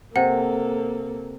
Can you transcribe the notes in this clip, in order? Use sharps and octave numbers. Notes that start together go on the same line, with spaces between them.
C3 A#3 A4 F#5